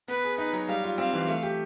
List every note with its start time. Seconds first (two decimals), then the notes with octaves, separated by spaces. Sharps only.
0.08 B3 B4
0.24 G#4
0.38 D#4
0.53 F#3
0.68 G3 F5
0.84 F4
0.98 C4 F5
1.13 E3
1.28 A3
1.43 G4